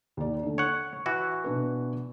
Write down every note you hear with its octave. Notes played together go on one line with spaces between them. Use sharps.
D#2 D5
D3 A3
C#5 F#5 C#6
E3 F#4
B2 D4 B4